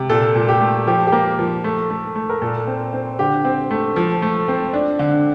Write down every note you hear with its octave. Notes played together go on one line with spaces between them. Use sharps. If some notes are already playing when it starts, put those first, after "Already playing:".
Already playing: C3
A#2 A4
A#2
G4
A3
F3 G4
G4
A#3
F3
A3
A3
A3
A#4
A#2 A4
C4
C4
D3 G4
C4
A3
F3
A3
C4
D4
D3